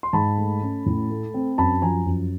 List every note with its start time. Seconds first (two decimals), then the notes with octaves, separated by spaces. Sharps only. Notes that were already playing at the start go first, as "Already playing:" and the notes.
0.03 C6
0.13 G#2 A5 B5
0.38 A3
0.62 C#4
0.86 A2
1.10 A3
1.34 C4
1.58 F#2 A5 B5
1.82 F3 G#5 A#5
2.06 F#2